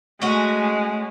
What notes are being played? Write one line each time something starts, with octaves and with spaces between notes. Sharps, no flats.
G#3 A3 C#4 F#4